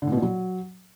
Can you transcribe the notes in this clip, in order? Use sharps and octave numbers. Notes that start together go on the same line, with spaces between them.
D3
A2
B2
A#2
F#3